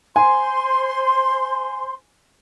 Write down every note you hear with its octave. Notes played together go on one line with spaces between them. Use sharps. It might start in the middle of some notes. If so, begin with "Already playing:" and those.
C5 G#5 C6